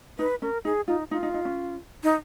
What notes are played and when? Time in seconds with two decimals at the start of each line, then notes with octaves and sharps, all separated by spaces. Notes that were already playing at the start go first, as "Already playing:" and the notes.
0.19 D#4 B4
0.42 C#4 A#4
0.65 D#4 G#4
0.88 D#4 F4
1.11 D#4 F4
1.23 D#4
1.34 D#4
1.45 C#4
2.03 D#4